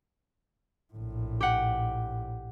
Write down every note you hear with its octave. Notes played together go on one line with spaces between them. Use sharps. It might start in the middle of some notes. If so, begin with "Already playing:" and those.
A#1 A2
G4 F#5